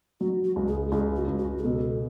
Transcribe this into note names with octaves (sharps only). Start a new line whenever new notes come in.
F#3 F#4
F#4
C#2
G#4
C#2 G#4
F#4
C#2
F#4
G#4
B2 A4